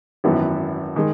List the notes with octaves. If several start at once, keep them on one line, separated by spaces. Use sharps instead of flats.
G#1 F#2 E3 B3
D#3 G#3